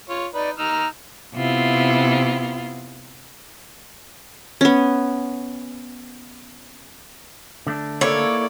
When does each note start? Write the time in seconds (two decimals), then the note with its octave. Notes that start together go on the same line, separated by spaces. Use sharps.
0.09 F4 C#5
0.34 D#4 B4 D5
0.58 D#4 A#5 E6 F6
1.34 C3 B3 E4 F4
4.61 B3 C#4
7.67 D3 A3 D4
8.01 A#3 E4 A4 C#5 D5